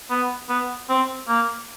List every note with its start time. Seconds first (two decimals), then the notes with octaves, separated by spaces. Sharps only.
0.10 B3
0.49 B3
0.89 C4
1.28 A#3